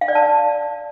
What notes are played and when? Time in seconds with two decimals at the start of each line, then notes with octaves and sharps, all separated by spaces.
0.01 F5
0.08 D5
0.15 A5